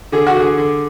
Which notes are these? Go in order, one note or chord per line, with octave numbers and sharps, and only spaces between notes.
D3 G#4
F#4
D3
G#4
D3